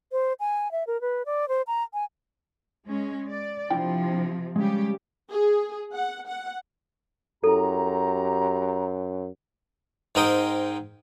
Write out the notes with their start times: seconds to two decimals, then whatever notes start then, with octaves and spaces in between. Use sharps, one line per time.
0.12 C5
0.40 G#5
0.72 E5
0.87 A#4
1.01 B4
1.26 D5
1.49 C5
1.67 A#5
1.94 G#5
2.85 G#3 C#4
3.29 D5
3.70 C3 F3 D4 E4 G5
4.56 C#3 G3 G#3 G4
5.31 G#4
5.94 F#5
6.29 F#5
7.44 F#2 E4 G4 A4 A#5
10.15 G#2 C4 A#4 D#5 G5 D#6